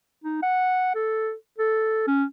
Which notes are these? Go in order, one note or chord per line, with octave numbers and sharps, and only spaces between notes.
D#4
F#5
A4
A4
C#4